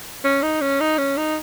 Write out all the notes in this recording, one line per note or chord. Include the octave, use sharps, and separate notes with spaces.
C#4
D#4
C#4
D#4
C#4
D#4